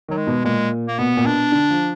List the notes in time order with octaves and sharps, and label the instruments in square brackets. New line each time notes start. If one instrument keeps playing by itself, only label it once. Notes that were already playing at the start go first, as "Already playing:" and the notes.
[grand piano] D#3 [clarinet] F#3
[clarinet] G#3
[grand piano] B2
[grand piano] A#2 [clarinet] G#3
[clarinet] A#3
[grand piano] B2 [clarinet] B3
[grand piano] A#2
[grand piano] B2 [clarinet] D4
[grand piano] D3
F3